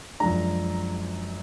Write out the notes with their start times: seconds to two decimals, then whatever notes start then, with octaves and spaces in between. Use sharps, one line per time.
0.20 F#2 F3 G#3 D4 A#5